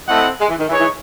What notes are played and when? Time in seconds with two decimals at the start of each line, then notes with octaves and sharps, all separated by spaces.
0.08 A3 C4 E4 A4 D#5 F#5
0.39 G#3
0.48 E3
0.58 D#3
0.68 E3 D#4 G#4 C#5
0.78 E3